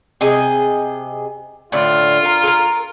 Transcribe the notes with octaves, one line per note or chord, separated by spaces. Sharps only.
C3 G#4 D#5
A2 D3 F4
A#4
A4 A#4